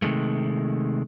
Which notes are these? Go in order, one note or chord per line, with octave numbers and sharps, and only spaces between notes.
C3 D#3 G#3 A3